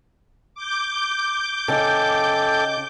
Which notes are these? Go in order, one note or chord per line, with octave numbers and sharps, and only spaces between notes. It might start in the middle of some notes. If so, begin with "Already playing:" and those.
D6 G6
C#3 D#4 A4 G5